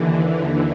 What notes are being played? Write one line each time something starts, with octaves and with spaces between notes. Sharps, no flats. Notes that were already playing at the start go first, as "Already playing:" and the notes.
Already playing: D#2 D3 E3
E3